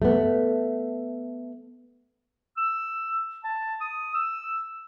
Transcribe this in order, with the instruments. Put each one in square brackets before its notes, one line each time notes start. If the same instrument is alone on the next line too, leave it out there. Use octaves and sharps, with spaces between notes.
[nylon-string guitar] A3 B3
[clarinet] E6
A5
D#6
E6